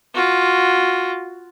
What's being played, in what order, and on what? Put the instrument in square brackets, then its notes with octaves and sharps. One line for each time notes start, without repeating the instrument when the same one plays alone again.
[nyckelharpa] F4 F#4